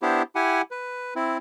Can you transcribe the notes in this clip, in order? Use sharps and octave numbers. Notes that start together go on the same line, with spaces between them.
B3 D4 E4 G4 C5
E4 G4 F#5 G#5
B4
C4 E4